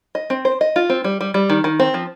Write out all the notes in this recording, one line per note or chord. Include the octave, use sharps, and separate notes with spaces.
D#5
C4
C5
D#5
F4
C4
G3
G3
G3
D#3
D#3
C4
F3